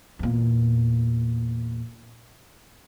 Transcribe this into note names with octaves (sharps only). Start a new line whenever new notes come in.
E2 A#2